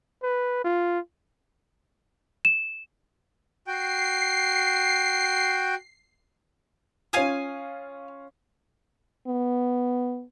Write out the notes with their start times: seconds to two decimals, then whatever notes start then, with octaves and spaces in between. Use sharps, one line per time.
0.23 B4
0.64 F4
2.45 E7
3.67 F#4 G5 C7
7.13 C#4 F4 F5 G#5 D#6
9.27 B3